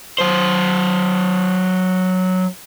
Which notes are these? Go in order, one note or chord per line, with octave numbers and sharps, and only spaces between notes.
F#3 C5